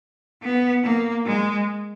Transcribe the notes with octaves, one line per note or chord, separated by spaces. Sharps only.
B3
A#3
G#3